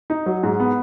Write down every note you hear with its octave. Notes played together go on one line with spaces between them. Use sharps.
D#4
F#3
G#2
B3